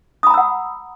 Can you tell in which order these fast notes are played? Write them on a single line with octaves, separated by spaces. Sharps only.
D#6 B5 A#5 E6 F#5